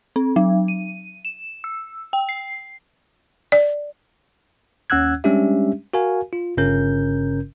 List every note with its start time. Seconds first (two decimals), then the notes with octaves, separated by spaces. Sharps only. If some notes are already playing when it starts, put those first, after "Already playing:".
0.16 C4
0.36 F#3
0.68 D#7
1.25 E7
1.64 E6
2.13 G5
2.29 C7
3.52 D5
4.90 D#2 C#4 F#5 E6 F#6 G#6
5.24 G3 G#3 C#4 D4 G4 E5
5.94 F#4 A#4 F5 G#5
6.33 F4
6.57 G1 G2 C#3 C#4 A#4 G6